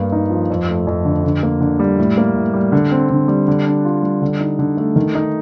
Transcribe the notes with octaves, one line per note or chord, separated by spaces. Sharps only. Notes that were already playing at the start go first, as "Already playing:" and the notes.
Already playing: G2 A#3
D#4
F3
F2
A3
F2
D3
D3
A#3
D3
G3
A2
A#3
A2
G3
D3
C4
D3
G3
D3
D4
F4
G3
D3
D#4
D3
A3
D#3
D#4